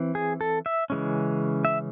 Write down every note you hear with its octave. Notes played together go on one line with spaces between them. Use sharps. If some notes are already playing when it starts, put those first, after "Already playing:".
Already playing: E3 C4
G#4
A4
E5
C#3 E3 G#3 C#4
E5